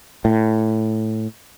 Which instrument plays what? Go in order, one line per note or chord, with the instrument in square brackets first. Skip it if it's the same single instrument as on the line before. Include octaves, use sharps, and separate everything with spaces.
[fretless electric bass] A2